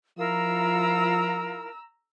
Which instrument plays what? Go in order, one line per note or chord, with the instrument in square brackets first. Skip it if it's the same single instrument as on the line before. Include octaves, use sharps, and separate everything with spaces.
[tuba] F3 [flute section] E4 F4 A#4 [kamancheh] A#5 E6